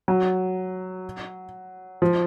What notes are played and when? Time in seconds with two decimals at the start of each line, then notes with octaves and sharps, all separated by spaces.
0.08 F#3
2.02 F3